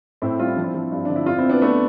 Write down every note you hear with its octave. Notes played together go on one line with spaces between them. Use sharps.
A2 C4 E4
G3 F4
E4
F3 D4
C4 E4
F3
G2
D3 D4
E4
F2 D4 F4
C4 E4
F2
B3 D4
A3 B3 D4